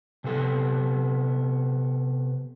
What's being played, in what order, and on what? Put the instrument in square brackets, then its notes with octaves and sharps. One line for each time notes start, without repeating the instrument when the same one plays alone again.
[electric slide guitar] C3 B3 A4